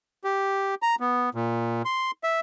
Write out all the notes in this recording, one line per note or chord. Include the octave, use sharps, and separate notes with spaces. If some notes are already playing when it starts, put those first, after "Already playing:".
G4
A#5
B3
A#2
C6
E5